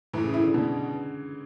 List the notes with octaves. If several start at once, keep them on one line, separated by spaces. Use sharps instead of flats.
A2 E3
C#3
E4
D3
B2 D3